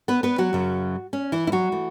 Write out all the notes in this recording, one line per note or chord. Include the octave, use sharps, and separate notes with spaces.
B3 B4
B3 B4
F#3 F#4
F#2 C#3 F#3
C#4
E3 E4
E4
F#3 F#4
E3 A3